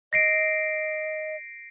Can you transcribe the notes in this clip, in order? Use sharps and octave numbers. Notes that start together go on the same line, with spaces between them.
D#5 A#6 C7 D7